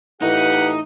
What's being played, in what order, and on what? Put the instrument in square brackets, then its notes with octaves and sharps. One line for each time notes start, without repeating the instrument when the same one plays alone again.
[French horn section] F2 G4 B4 [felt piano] A2 E3 A3 [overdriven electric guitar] D#4 [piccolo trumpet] F#5